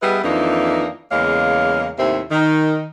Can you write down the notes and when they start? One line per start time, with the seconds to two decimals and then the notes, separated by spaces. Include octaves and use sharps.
0.02 G3 B3 E4 G#4 B4 D#5
0.23 F2 D#3 E3 A#3 D4 D#4
1.11 E2 C#3 G#3 A#3 C#5 F5
1.98 D#2 A2 C3 C4 E5
2.31 D#3